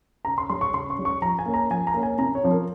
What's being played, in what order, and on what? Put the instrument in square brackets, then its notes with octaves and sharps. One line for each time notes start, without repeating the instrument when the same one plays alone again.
[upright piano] C#3 A#5
C6
G3 C#4 C6
C#6
C#3 C6
C#6
G3 C#4
C#6
F3 A#5
G#5
A#3 C#4
A#5
F3 G#5
A#5
A#3 C#4
G#5
C3 A#5
C#5
F3 C4
A#4